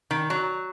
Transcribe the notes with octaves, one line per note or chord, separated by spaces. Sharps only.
D#3
F#3